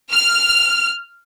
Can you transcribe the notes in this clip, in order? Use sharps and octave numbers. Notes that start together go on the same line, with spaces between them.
F6